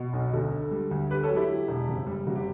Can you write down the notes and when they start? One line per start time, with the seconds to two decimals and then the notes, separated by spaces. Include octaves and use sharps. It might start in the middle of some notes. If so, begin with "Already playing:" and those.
Already playing: B2
0.13 B1
0.33 D2 F#4 A4
0.52 D3
0.71 G3
0.91 D2
1.10 D3 G4 B4
1.23 A4 C#5
1.30 F#3
1.36 E4 G4
1.50 F#3
1.68 E1
1.88 F#1
2.06 G3
2.27 F#1 F#4
2.36 G4